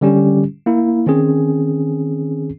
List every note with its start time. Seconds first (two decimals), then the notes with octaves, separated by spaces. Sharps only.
0.01 D3 G3 C#4 G4
0.66 A#3 E4
1.06 D#3 C4 C#4 G#4